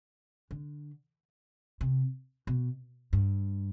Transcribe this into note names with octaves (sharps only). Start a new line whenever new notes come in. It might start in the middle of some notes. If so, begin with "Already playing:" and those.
D3
C3
B2
G2